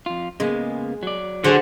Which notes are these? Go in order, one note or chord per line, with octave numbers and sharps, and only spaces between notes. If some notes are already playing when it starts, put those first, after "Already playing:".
F2 F4
C#3 G#3 A#3 B3
F#3 D5
D3 F#4 G#4 C5